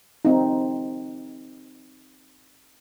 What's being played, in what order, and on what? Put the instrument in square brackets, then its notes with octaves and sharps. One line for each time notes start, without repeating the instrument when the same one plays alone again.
[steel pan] C4 D#4